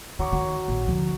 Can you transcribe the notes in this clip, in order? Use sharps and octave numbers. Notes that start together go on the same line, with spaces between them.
D#3 F#3 C#6 D6
D#3 F#4 C#5
A#1
D3 F3